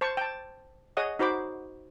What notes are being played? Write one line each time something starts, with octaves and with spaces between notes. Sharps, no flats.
C5 A5 C#6
G5 A5
G#4 C#5 D#5 F#5 D#6
D#4 F#4 C5 B5 D6